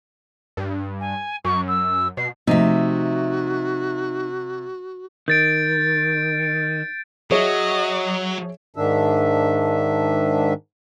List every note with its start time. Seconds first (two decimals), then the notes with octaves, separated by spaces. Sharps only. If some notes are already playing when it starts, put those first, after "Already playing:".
0.57 G2
1.00 G#5
1.44 F#2 C#6
1.68 E6
2.17 B2 C7
2.47 C3 F3 A3 D#4 F#4 E5
5.28 D#3 G6 A6 D7
7.31 F#3 G#4 C#5 D#5 E5
8.76 G#2 D#3 D4 E5